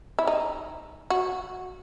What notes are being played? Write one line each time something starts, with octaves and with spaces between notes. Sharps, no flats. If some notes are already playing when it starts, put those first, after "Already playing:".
E4
D#4
F#4